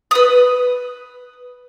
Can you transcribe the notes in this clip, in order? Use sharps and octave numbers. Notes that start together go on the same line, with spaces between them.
B4 D#6